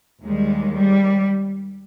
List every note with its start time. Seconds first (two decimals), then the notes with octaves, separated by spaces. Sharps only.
0.23 D#2 D#3 G3 G#3
0.75 G3